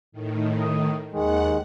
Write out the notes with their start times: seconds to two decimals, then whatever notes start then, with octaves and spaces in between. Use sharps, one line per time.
0.12 A2 D#3
0.61 D#6
1.13 D#2 D#3 G#3 F#5